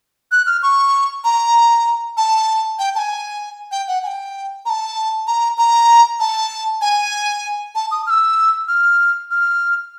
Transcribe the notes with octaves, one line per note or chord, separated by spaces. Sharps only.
F#6
F6
C#6
A#5
A5
G5
A5
G#5
G5
F#5
G#5
G5
A#5
A5
A#5
A#5
A5
G#5
A5
D#6
F6
E6
F6
F6